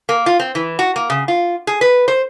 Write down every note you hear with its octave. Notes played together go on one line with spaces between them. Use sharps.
A#3
F4
C4
E3
F#4
A#3
C#3
F4
G#4
B4
C5